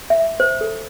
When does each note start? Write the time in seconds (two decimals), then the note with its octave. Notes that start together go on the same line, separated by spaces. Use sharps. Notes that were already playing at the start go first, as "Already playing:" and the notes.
0.10 E5
0.40 C5
0.61 A4